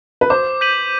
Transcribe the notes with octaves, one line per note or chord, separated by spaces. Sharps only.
B4
C5 D6
G6 B6 D#7 F#7